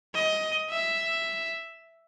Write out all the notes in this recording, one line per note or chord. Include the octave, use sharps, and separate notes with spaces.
D#5
E5